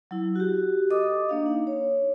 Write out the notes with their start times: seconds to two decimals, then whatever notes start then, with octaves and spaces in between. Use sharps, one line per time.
0.11 F#3 E4
0.36 F#4 G4
0.90 A4 D#5 D6 D#6
1.29 A#3 D4 F5
1.46 D#4
1.67 C#5